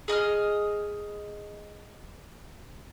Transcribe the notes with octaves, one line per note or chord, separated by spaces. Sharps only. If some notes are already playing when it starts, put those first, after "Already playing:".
G#4 D#5 D#6 F6